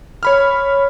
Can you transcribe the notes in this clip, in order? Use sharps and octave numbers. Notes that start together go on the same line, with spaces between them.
C#5 B5 F6